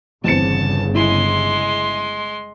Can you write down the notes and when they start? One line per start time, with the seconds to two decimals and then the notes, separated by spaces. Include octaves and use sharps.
0.24 G1 E2 C#3 C4 A5 C#7
0.95 G#3 E4 C6